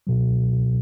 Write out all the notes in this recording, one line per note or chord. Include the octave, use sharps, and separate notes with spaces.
C#2 B2 F#3